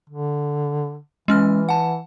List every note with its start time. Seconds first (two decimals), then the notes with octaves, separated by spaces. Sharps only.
0.10 D3
1.28 E3 G#3 C#4 F6
1.69 F#5 A5